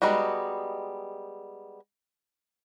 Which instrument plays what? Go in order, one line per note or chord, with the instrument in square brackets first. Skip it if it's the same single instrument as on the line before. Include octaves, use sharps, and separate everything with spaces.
[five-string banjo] G3 G#3 B3 D#4 F#4